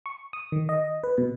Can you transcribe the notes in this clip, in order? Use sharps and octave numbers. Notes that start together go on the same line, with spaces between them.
C#6
D#6
D#3
D#5
B4
B2